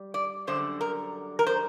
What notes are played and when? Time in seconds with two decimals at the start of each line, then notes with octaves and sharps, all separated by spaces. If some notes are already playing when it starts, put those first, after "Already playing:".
Already playing: G3
0.14 D5
0.47 F#2 D3 G3 C5
0.81 A#4
1.39 A#4
1.47 C5